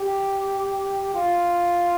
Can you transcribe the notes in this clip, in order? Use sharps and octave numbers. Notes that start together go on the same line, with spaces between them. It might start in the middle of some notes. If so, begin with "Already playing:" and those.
Already playing: G4
F4